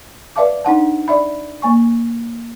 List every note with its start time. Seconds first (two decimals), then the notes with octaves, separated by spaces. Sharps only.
0.36 B4 D5 E5 F5 A5 D6
0.65 D4 D#4 F#5 A5
1.08 D5 E5 B5
1.62 A#3 G#5 C#6